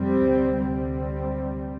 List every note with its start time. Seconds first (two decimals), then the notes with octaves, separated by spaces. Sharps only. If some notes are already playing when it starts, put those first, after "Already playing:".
Already playing: F2 C3 G3 C4
0.27 D2 C3
0.60 G3 C4